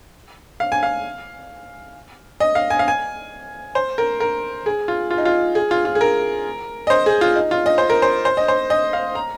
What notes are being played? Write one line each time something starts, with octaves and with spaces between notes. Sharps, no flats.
F5
G#5
F5
D#5
F5
G#5
F5
G#5
C5
A#4
A#4
G#4
F4
F4
D#4
F4
G#4
F4
F4
G#4
A#4
D#5
C5
G#4
F4
D#4
F4
D#5
C5
A#4
C5
C5
D#5
C5
D#5
F5
A#5